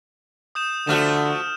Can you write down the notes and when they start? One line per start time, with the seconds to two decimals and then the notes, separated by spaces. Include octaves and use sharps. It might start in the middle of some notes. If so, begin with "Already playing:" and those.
0.55 D#6 G6 E7
0.87 D3 F3 A3 F#4 F6 E7